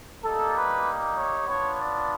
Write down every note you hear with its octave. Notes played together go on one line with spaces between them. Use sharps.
G3 A#3 D#4 G4 A4
B4
C#5
B3 D4 F4 C#5
D5